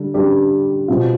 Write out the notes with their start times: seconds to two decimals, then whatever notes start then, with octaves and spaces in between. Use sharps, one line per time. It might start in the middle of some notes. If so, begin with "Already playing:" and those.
Already playing: D3 G3
0.14 D3 G3 D4 G4
0.88 B2 G3 C4 F4